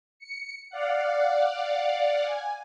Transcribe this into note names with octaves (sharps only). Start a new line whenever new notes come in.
C#7
D5 F5 F#5
G#5